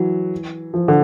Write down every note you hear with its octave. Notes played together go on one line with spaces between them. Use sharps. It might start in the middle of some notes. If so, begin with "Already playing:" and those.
Already playing: E3 F#3
F3
D3